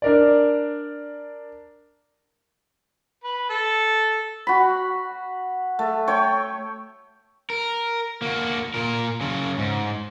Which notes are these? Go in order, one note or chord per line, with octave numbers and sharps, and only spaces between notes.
D4 A#4 D5
B4
A4
F#4 B5
A3
C#5 G5
A#4
A#3 F#4
A#2 A#4
C#3 F#3
G#2